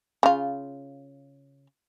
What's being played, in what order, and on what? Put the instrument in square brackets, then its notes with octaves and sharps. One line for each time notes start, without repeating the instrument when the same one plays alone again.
[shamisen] C#3 F4